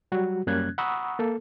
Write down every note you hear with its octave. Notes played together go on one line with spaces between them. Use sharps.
F#3 G3 F#4
F#2 G3 A#3 C#4 F#6 G#6
F#5 A#5 B5 C#6 D#6 E6
A#3 A4